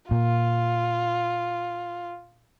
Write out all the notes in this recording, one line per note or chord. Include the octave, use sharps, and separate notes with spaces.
A#2 F4